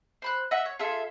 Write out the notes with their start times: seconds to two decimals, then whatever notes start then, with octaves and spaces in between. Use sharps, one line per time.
0.22 C5 B5 F#6
0.51 D#5 E5 F#5
0.66 C#5
0.79 F4 G#4 A4 E5